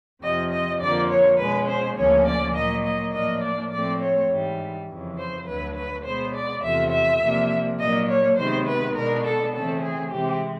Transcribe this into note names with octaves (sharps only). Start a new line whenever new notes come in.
F2 C3 F3 D#5
D#5
F2 D3 F3 A#3 D5
C#5
B2 G#3 C#4 B4
C5
D2 C#3 F3 A#3 C#4 C#5
D5
A#2 F#3 A#3 D#5
D#5
A2 F3 A#3 D4 D#5
D5
A2 F3 A3 C4 D5
C#5
G#2 E3 G3
F2 C#3 E3
C5
D2 D3 F#3 B4
B4
B2 G#3 B3 C5
D5
E2 C3 F3 A3 E5
E5
C3 F3 A#3 D4
A#2 F#3 A#3 D4 D#5
C#5
C3 D#3 G#3 B3 C5
B4
B2 G#3 B3 D4 A#4
A4
C#3 E3 A3 C4 A4
G#4
C3 E3 G#3 C4 G4